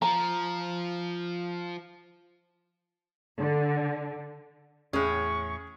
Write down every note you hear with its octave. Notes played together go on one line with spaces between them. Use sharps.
F3 A#5
D3
E2 A2 C#4 G#4 C#6